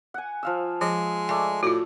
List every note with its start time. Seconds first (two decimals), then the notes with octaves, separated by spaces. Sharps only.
0.14 F#5 G#5
0.43 F3 F5 E6
0.81 F3 G#3 D#5
1.29 A3 D5 G#5
1.63 A2 F4 F#4